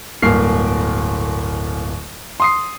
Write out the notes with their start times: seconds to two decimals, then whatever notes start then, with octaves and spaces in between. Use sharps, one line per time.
0.22 D1 G1 A#3 F6 C7
2.40 C6 D#6 C7